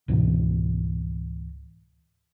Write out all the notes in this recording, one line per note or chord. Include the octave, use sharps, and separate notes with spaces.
C#2 G#2 B2 E3